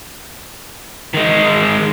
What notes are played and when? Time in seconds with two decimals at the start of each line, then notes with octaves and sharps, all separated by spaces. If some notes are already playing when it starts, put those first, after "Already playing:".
1.14 D#3 G#3